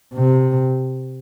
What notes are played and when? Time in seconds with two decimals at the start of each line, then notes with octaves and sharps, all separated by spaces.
0.14 C3